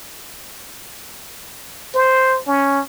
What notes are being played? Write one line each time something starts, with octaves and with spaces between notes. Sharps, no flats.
C5
C#4